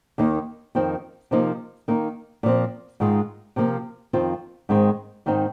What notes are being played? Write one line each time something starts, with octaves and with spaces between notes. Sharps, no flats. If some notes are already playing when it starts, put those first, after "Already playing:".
D#2 D#3 A#3 D#4
F2 D#3 C4 D#4
C3 F3 A#3 D#4
D#3 A#3 D#4
A#2 F3 C4
G#2 D#3 G#3 F4
C3 F3 A#3
F2 D#3 C4 F4
G#2 D#3 G#3 C4
G#2 D#3 C4 D#4